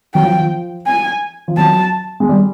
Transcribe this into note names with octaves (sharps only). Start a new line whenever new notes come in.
F#3 G5
F3
F3
G#5
F3
F#3 A5
G#3
G3